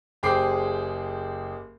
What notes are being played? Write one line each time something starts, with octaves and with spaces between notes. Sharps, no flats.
F#1 G4 G#4 C5 D6 C7